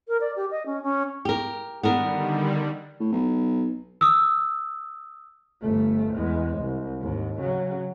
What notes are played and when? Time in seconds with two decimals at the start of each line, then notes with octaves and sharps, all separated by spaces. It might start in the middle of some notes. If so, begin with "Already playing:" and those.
0.08 A#4
0.21 D5
0.36 G4
0.51 D#5
0.66 C#4
0.83 C#4
1.25 G4 A#4
1.83 D3 D#3 G3 B3 D4 A#4
3.00 A2
3.12 B1
4.01 D#6 E6
5.62 G1 A3
6.14 E2 G#3
6.59 C2
7.01 D#2 G#2
7.40 C#3 F#3